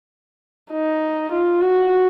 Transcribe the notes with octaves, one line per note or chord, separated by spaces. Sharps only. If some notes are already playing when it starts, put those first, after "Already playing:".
D#4
F4
F#4